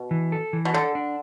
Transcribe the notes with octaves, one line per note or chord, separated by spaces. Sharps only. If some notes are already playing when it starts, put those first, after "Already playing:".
Already playing: B2
E3
A4
E3
B2
D3 A4
D4